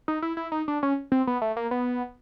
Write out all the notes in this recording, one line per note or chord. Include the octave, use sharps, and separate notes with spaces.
D#4
E4
E4
D#4
D4
C#4
C4
B3
A3
A#3
B3